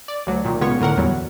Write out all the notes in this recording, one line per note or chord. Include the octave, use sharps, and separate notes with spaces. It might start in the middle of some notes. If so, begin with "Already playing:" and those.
D5
D2 F#3
A#2 D#3
C#2 C#3 B3 F4 C#5 C#6
A2 D3 A#4 F#5
E2 F#3 G3